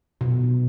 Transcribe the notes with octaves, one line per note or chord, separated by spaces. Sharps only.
B2